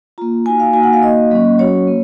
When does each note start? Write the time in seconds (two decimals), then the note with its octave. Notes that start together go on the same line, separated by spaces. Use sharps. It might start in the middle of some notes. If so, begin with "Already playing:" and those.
0.18 A#3 F4 A#5
0.46 A#3 D#4 F#4 G#5
0.60 F5
0.73 A#3 D#4 F#4 G#5
0.83 F#5
0.93 F5
1.02 A#3 D#4 F#4 D#5
1.31 F#3 A#3 C#4
1.58 F#3 C#4 F#4 C#5
1.87 A#3